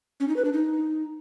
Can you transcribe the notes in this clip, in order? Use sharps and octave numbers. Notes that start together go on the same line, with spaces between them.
C#4
D#4
B4
D4
D#4